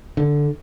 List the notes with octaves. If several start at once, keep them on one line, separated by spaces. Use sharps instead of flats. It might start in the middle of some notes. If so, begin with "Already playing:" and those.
D3